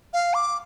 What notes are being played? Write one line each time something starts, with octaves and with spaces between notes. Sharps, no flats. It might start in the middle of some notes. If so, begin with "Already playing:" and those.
F5
D6